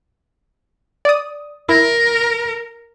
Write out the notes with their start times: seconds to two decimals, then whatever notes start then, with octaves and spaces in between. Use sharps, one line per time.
1.05 D5 D#6
1.69 E4 A#4